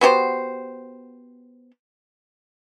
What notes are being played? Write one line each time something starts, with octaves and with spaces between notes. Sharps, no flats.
B3 F#4 G4 C5